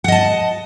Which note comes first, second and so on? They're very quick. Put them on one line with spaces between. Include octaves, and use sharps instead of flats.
F#5 D#5 A5